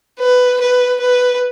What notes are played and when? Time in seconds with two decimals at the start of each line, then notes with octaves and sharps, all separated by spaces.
0.20 B4
0.61 B4
1.01 B4